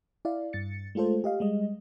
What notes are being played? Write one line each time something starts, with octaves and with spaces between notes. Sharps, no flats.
E4 D5 F5
G2 A6 C#7
G#3 A3 F4 A4 C5
G4 D#5 F5
G3 G#3 D#5